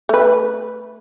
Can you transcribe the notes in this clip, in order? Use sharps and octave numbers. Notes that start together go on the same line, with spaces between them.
A3 B4